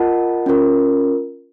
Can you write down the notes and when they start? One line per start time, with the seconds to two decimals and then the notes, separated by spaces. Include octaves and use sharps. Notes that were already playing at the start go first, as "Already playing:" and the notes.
Already playing: F4 A#4 D#5 F#5 A5
0.46 C#4 F4 A#4